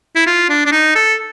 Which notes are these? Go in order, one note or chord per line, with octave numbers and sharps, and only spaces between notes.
E4
F4
D4
D4
D#4
A4